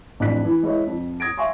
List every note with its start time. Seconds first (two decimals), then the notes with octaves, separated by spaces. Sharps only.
0.20 A1 F2 D4 F#6 B6
0.45 E3
0.63 G#3 E4 B4 C#5 D#5
0.87 F2
1.20 D#6 G#6 A#6 D7
1.37 E5 F5 G#5 C6 C#6